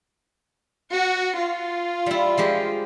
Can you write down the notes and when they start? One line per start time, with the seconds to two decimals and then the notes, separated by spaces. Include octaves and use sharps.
0.91 F#4
1.37 F4
2.06 G3 E4
2.38 F3 G#3 G4